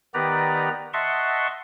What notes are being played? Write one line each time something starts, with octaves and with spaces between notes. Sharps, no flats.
D#3 B3 G4 B4 D5 A#5
D#5 E5 F#5 A5 C6 C#6